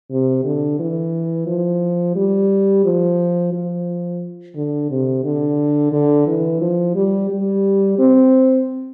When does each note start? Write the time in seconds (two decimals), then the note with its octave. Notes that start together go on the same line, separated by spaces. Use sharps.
0.11 C3
0.44 D3
0.79 E3
1.47 F3
2.15 G3
2.85 F3
3.52 F3
4.56 D3
4.90 C3
5.24 D3
5.92 D3
6.27 E3
6.61 F3
6.95 G3
7.30 G3
7.99 C4